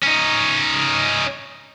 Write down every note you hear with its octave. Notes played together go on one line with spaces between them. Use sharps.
C#4 D#4